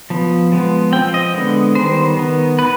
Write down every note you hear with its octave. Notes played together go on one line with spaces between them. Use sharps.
F3 B3
F3 G#3 B3
F3 C4 G5
D#5
D3 G#3 B3
D#3 G3 B3 C5
D#3 B3
B3 B4